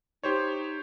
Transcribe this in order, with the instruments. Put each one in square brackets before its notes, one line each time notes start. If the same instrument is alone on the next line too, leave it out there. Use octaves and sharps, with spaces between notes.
[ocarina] D#4 [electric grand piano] G4 C5 C#5